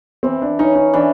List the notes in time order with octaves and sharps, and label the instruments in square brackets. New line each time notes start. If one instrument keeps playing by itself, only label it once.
[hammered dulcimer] E3 [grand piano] C4
[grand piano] D4
[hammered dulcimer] C#4 [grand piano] D#4
[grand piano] D#4
[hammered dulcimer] E3 [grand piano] D4